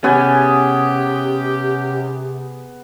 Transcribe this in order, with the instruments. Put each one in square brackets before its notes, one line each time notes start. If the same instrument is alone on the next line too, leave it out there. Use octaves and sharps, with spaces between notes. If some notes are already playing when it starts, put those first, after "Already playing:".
[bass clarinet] C3 [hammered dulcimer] B3 G#4 G#5 [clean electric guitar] C#4 [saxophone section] G4